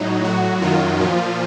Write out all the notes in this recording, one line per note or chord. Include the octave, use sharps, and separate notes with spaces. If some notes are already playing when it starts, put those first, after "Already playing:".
Already playing: A2 F#3 D#4
A2 F#3 F#4
F#2 D#3 F#3 F4
A#2 F3